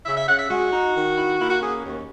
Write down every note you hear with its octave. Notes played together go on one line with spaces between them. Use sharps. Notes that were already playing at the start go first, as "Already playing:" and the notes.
C#3 E5
E5
C#3 F#5
E5
G#3 F#4
D#4
D#3
E4
A#3 E4
F#4
C#4 G#4
D#2